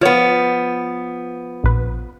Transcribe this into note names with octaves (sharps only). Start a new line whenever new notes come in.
F3 B3 F4 C#5
A#1 B4